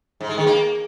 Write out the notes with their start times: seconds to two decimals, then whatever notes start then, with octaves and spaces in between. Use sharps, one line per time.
0.21 G#2
0.29 G#3
0.38 D#3
0.46 A#3